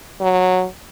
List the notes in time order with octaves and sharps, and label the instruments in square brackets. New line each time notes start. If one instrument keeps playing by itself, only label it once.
[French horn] F#3